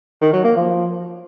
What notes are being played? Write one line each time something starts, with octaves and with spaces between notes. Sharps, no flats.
D#3
F#3
A#3
F3